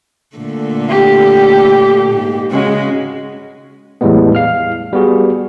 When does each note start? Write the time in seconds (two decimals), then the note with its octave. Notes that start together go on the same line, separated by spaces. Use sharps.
0.36 A#2 D3 A3
0.89 G4
2.13 G#2 A#3
2.50 C#3 G#3 C#4 F#4
4.01 E2 A2 G3 G#3 B3
4.35 F5 F6
4.93 G3 B3 F#4 G#4